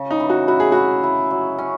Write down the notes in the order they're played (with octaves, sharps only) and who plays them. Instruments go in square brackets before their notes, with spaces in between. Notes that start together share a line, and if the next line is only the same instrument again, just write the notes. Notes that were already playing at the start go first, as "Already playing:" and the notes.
Already playing: [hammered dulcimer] C#3
[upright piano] D#4
[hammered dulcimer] E3
[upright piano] F#4
[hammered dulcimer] E4 [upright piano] F#4
[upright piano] G#4
[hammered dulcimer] E4 [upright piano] F#4
[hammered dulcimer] E4
F#3
C#4